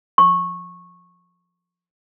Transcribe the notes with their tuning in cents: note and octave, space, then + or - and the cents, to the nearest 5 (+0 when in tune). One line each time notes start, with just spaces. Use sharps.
C#6 -15